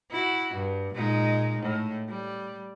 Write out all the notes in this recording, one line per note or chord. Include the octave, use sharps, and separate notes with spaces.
E4 F#4
G2
A#2 G#3 D#4
A2
G3